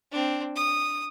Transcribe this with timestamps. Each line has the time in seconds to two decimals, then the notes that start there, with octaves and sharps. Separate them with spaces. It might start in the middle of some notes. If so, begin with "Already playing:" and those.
0.12 C4 D4
0.56 D#6